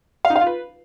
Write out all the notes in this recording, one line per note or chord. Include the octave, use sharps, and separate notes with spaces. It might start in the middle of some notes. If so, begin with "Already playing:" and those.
F5
D#4
F5
F4
B4